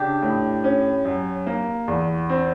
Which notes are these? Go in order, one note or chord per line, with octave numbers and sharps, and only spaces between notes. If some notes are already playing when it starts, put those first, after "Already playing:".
Already playing: C#3 D4 G4
A2
C#4
F#2
A#3
E2
C4